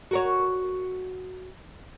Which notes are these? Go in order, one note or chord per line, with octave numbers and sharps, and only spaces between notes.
F#4 A#4 C#5